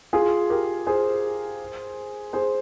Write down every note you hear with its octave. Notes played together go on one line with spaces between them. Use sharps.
F4 G#4
G4 A#4
G#4 C5
G#4 C5